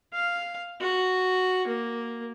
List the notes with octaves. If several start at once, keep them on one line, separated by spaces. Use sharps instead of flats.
F5
F#4
A#3